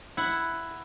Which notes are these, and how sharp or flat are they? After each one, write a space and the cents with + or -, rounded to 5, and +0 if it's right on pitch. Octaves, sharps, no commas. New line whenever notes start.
E4 +5 F#5 +0